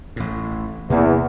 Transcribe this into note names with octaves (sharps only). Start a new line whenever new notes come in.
A1 A2
E2 C3 A#3 C4